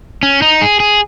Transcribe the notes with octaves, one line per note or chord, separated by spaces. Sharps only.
C#4
D#4
G#4
G#4